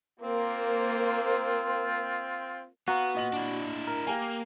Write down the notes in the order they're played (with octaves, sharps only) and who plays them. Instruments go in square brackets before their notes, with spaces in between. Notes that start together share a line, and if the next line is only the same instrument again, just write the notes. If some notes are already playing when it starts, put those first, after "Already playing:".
[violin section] A#3 C5 [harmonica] C4 F4
[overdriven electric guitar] B3 [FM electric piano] F#4 [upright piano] F5 A#5
[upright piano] A#2 D#5 F#7
[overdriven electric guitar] D4 E4
[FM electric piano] A#4
[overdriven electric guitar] A#3 [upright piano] G4 F5 G#5